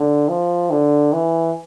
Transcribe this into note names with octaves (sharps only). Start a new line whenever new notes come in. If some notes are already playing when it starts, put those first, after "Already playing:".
Already playing: D3
F3
D3
E3